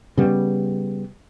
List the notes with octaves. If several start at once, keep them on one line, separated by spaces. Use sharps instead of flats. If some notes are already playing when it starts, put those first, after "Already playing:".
C#3 G3 B3